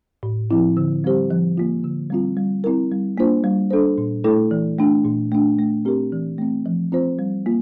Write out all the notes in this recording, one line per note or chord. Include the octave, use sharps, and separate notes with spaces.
A2
F3 C4 E4
D3
G3 C4 G4 C5
F3
A#3 F4
D3
G3 C4 F4
G3
C4 E4 A#4
G3
A#3 D4 F4 C5
G3
D4 A4 C5
A#2
A3 E4 A4
E3
A3 D4
A#2
A3 D4
A3
C4 G4 A#4
E3
A3 C4
F3
C4 F4 C5
G3
A#3 F4